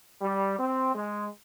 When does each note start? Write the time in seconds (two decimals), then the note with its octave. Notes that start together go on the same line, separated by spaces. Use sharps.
0.21 G3
0.59 C4
0.95 G#3